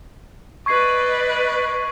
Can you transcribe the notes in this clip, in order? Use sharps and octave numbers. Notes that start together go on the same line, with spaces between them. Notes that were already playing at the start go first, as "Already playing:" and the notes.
B4 D5 D#5 C#6 G#6 C7